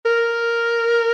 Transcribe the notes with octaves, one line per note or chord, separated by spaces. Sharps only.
A#4